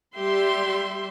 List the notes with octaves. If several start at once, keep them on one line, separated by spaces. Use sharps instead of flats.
G3 G4 E5 C6